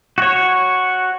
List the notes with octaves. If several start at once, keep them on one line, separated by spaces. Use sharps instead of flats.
F#4 C#5